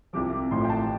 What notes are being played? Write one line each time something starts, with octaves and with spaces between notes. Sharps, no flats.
C2 C3 F3 D6
A1 A2 F3 C6
G5
A5